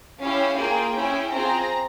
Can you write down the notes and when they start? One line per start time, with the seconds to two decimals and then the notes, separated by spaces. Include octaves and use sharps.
0.21 C#4 E4 G4 F5
0.58 A#3 F4 G#4 G5
0.96 C#4 E4 G#4
1.33 C4 F4 G#4 A#5